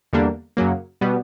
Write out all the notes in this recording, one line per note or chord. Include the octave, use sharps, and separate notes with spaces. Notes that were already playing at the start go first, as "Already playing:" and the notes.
E2 D3 G3 A#3 D4
F#2 C#3 F#3 A#3
B2 G3 B3